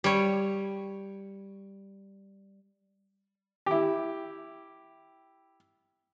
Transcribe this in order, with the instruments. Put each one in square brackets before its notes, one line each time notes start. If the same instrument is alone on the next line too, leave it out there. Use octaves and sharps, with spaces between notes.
[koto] G3 C#5
[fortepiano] E4 G4